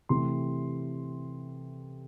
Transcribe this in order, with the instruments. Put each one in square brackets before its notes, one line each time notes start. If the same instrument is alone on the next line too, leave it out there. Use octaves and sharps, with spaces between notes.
[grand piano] C3 E3 A3 C6